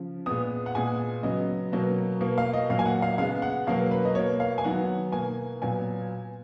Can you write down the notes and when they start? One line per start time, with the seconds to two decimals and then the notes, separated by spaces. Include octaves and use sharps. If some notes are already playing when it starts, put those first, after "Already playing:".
Already playing: C#3 F3
0.26 A#2 G#3 B3 D#6
0.66 F#5
0.75 A#2 G#3 B3 G#5
1.23 C#3 F#3 B3 D#5
1.72 B2 F#3 A#3
2.21 B2 A#3
2.38 F5
2.53 D#5
2.69 A#2 F#3 A#3 F5
2.79 G#5
2.86 F#5
3.02 F5
3.18 C#3 G#3 B3 F5
3.42 F#5
3.67 B2 F#3 A#3 F5
3.91 B4
4.05 D#5
4.15 B2 A#3 C#5
4.40 F5
4.58 G#5
4.64 D#3 F#3 B3 F#5
5.12 B2 A#3 G#5
5.62 A#2 F#3 B3 G#5